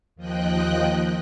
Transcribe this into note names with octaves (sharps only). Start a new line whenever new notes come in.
D#2 F3 D#5 G5 F#6